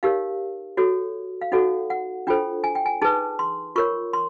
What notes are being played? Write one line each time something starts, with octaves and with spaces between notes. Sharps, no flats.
D#4 G4 A#4 C#5 F5
F#4 A4 C#5
F5
D#4 F#4 A4 C#5 F#5
F#5
D4 F4 A4 C5 G5
G#5
G5
G#5
D#4 G#4 B4 A5
C6
F4 A#4 C#5 C#6
C6